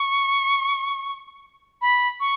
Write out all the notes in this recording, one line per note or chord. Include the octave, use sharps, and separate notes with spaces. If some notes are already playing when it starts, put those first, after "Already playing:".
Already playing: C#6
B5
C#6